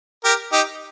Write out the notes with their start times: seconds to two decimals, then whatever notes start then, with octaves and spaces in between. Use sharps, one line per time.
0.24 G4 A#4
0.52 D#4 G4